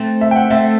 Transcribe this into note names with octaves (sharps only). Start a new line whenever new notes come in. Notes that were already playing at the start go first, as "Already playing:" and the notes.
Already playing: A3 C4
E5
G5
F#5
A3 C4 E5